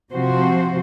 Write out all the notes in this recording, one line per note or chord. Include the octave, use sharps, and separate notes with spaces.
C3 F3 C4 F#4 C5